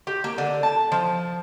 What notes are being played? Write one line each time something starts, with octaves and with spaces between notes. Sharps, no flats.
G4
A#3
D3
A5
F3